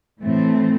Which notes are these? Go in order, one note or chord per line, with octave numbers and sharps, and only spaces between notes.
A2 E3 A3 C4